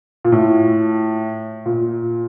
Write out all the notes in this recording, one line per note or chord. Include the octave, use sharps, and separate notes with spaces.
A#2
A2
A#2